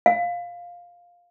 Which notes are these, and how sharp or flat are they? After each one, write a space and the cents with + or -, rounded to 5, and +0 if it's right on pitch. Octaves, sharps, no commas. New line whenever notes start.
F5 +10